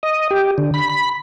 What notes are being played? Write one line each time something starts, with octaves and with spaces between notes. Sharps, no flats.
D#5
G4
D3
B5
B5